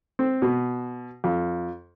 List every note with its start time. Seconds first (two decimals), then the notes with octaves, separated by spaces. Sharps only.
0.19 C4
0.42 B2
1.24 F2